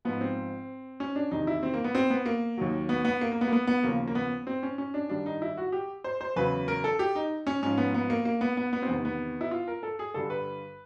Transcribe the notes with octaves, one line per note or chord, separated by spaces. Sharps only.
G#2 F3 B3
C4
C#4
D4
E2 C3 D#3 D#4
E4
C4
A#3
B3
C4
B3
A#3
D#2 D#3 F#3
B3
B3
A#3
A#3
B3
A#3
B3
B3
D#2 C#3 F3 A#3
A#3
B3
C4
C#4
C#4
D4
G2 D#3 G3 D4
D#4
E4
F#4
G4
C5
C5
E2 C#3 F#3 B4
A#4
A4
G4
D#4
C#4
G#2 F3 C#4
B3
B3
A#3
A#3
B3
B3
B3
C4
E2 C3 D#3 B3
B3
E4
F4
A#4
A4
G#4
G2 D3 G3 A4
B4